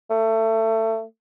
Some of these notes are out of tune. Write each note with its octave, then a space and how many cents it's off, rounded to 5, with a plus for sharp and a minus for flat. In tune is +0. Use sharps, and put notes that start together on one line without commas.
A3 +25